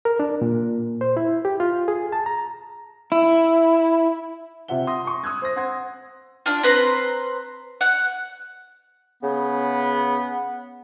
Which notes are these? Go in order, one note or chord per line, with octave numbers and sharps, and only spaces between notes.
A#4
D4
A#2
C5
E4
G4
F4
G#4
A5
A#5
E4
C3 F4 E5 F#5 G7
C6 D#6 A#6
C6 C#6
D#6 E6 F#6 G#6
C5 C6 A#6
C5 F#5 C6 G#6 A#6
D4 F4
C4 B4 A#5 C6
F#5
C#3 B3